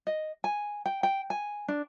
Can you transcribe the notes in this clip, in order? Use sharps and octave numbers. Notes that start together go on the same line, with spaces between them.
D#5
G#5
G5
G5
G#5
D4